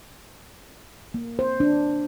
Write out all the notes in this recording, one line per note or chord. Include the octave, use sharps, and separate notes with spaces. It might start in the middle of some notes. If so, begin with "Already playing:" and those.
A#3
C5
D4